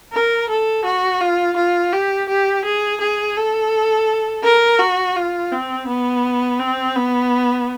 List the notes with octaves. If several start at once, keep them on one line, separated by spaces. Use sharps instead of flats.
A#4
A4
F#4
F4
F4
G4
G4
G#4
G#4
A4
A#4
F#4
F4
C4
B3
C4
B3